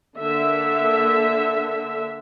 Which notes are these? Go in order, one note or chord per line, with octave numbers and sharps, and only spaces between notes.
D3 A#3 E5